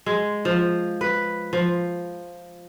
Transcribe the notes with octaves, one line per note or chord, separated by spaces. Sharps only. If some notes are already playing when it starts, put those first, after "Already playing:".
G#3
F3
B4
F3